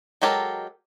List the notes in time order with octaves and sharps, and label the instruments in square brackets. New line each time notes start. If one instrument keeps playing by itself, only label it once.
[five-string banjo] F#3 G#3 G4 A4 A#4